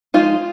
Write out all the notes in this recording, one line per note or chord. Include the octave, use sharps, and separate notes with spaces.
F3 G#3 D#4 F4